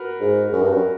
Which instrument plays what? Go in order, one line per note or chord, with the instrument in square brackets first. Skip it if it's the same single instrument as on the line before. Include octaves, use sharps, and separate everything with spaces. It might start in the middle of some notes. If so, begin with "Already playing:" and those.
Already playing: [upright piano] F#4 A#4 B4
[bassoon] G#2
F#2
G2
F#2